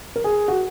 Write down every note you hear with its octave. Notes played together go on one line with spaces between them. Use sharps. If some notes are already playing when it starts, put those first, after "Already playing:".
A#4
G#4
F#4